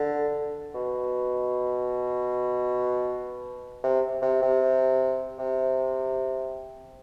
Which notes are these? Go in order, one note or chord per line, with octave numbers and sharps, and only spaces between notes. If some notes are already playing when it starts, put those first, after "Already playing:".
Already playing: D3
B2
C3
C3
C3
C3